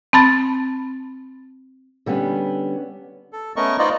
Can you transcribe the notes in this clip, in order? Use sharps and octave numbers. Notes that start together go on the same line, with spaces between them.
C4 A5 B5 A6
D3 G3 B3 C#4
A4
A3 B3 C#4 A#4 D#5 C#6
B3 D#4 F4 C5 D5 D#5